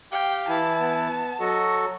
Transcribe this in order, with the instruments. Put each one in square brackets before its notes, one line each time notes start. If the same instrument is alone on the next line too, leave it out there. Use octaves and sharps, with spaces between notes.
[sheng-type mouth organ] G4 F5 [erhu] G5
[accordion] E3 E4 [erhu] A5
[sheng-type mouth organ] B3
[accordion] F#3 F#4 A4 [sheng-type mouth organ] D#5 C#6